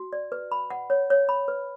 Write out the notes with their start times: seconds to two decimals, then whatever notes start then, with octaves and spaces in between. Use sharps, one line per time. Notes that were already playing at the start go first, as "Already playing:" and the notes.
Already playing: F#4
0.13 D5
0.32 B4
0.52 B5
0.70 F#5
0.90 C#5
1.10 C#5
1.29 B5
1.48 B4